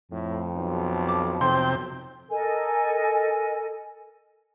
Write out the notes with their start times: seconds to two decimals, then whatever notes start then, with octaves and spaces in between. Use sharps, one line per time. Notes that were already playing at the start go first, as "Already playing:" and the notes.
0.12 F2 A2
0.56 B1
1.08 D6
1.41 B1 C3 G5 C6
2.31 A4 A#4 D#5 G#5